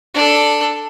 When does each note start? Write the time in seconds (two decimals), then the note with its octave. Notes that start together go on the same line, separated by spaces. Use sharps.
0.14 D4 A4